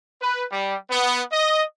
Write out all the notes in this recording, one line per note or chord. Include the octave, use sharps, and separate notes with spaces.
B4
G3
B3
D#5